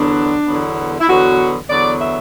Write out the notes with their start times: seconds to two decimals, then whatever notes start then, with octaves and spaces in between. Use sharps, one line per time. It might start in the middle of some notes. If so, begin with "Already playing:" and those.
Already playing: E2 D3 F#3 B3 D4
0.47 E2 D3 F#3 B3
1.00 E4
1.08 E2 D3 F#3 B3 F#4
1.70 E2 D3 F#3 B3 D5
2.01 E5